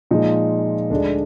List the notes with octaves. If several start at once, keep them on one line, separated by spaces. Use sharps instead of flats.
A#2 F3 G#3 D#4
D2 D3 G#3 D4